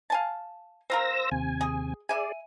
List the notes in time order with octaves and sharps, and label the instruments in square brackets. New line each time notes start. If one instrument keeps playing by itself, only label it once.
[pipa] F5 G#5 A5
[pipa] C4 F4 A#4 [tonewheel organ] C5 E6 A#6
[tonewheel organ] D#2 C3 G#5
[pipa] G#4
[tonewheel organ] G#4 D5 [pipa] E5 G#5